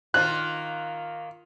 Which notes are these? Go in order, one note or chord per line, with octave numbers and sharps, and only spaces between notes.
D#3 A#3 F4 F#6